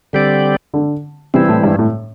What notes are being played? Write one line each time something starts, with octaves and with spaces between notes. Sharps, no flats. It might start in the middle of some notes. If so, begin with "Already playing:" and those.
D3 G3 C4 G4 D5
D3
C3 E3 G3 C4 E4
A2
G2
A2